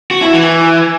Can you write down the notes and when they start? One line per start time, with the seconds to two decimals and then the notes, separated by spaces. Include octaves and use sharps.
0.11 F#4
0.22 E4
0.33 E3